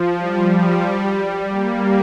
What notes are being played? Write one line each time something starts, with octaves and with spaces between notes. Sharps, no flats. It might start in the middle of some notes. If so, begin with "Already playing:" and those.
Already playing: F3
G3
A#3